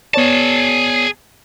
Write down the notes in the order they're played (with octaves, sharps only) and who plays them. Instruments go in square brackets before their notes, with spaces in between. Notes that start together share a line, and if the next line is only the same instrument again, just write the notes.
[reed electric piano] B3 C#5 D5 [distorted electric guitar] G#4 A5